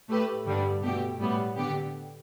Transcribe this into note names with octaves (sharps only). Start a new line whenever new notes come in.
A2 A3 G4 B4
G2 D3 G3 B3 D4
B2 A3 G4
A2 G3 B3
D3 B3 G4